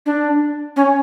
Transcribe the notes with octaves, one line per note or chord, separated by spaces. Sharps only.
D4
C#4